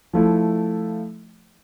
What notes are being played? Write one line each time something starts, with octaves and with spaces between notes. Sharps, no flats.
F3 A3 E4